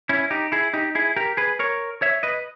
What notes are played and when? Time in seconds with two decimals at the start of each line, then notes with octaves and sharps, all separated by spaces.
0.09 C#4 E4
0.31 D#4 G4
0.52 E4 G#4
0.74 D#4 G4
0.95 E4 G#4
1.16 G4 A#4
1.37 G#4 B4
1.59 A#4 C#5
2.02 C#5 E5
2.23 B4 D#5